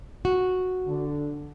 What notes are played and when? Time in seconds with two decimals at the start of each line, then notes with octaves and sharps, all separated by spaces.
0.25 F#4
0.87 D3